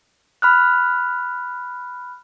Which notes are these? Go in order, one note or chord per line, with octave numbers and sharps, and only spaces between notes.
B5 F6 F#6